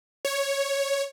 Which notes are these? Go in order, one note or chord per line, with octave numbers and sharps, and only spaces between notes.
C#5